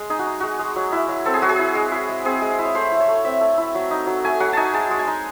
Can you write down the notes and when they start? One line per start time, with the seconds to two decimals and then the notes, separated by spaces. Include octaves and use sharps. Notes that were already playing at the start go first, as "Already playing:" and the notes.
Already playing: G#3
0.10 D#4 G#4
0.19 F#4
0.26 D#4
0.40 G#3 F#4
0.59 G#3
0.76 F#3
0.92 E4
1.09 F#3
1.25 C4 A4
1.34 G#4
1.42 F#3 F#4
1.49 G#4
1.59 E4
1.75 G#3
1.91 E4
2.09 G#3
2.25 C4 G#4
2.42 G#3
2.59 E4
2.65 C#5
2.75 A3 C5
2.91 E4
3.00 C#5
3.08 A3
3.24 C4 E5
3.41 A3
3.58 E4
3.75 F#3
3.91 D#4
4.07 F#3
4.25 A3 G#5
4.40 F#3 F#5
4.53 D#4 G#5 A5
4.73 G#3 A5
4.91 G#3
4.99 G#5
5.07 D#4